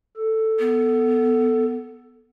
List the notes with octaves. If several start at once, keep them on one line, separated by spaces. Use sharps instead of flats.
A4
B3